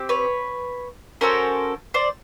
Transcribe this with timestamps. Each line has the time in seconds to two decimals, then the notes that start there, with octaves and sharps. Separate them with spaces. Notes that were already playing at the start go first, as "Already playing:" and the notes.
Already playing: C4 G4
0.09 B4 C#5
1.21 C#4 F#4 A4 A#4 C5
1.94 C5 D5